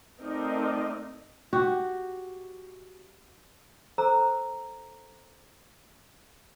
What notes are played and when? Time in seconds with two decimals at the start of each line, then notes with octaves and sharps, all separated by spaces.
0.21 A3 C4 D#4 A#4 D5 D#5
1.53 F#4 G4
3.98 A4 C5 A#5 E6